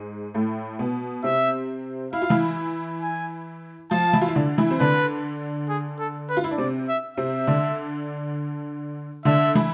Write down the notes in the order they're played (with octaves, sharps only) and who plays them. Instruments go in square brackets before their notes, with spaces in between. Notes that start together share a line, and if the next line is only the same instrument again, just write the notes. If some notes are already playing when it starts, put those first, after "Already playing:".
Already playing: [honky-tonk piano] G#2 G#3
A2 A3
B2 B3
[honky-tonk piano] C3 C4 [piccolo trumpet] E5
[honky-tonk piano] E4 [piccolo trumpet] F5
[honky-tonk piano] F4
E3 E4
[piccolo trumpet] G#5
[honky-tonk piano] F3 F4 [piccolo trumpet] A5
[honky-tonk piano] E3 E4
F4
E4
D3 D4
E3 E4
C4
[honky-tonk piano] D3 D4 [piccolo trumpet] B4
[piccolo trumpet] G#4
A4
B4
[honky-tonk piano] F4
E4
D4
[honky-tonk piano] C3 C4 [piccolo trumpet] D5
[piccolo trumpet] E5
[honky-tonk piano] C3 C4 [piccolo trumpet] E5
[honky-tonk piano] D3 D4
[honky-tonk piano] D3 D4 [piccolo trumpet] E5
[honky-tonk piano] E3 E4